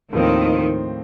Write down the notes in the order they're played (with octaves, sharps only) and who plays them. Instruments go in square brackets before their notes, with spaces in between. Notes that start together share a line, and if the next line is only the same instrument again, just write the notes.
[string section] D#2 D#3 [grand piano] A2 F3 C4